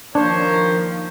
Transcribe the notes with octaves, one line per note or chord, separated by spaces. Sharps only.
D#3 F3 A#3 D4 A#4 C5 C#5